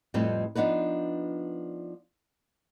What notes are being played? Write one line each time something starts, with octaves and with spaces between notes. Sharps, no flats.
F2 A2 G3 C4 B4 D#5
F3 B3 D4 D#4 B4